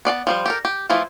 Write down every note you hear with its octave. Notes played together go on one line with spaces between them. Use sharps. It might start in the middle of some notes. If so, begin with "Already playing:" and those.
B3 D5 F5 A5
F3 G3 C5
G4 A4 A#4
G4
E3 F3 A3 E4 F4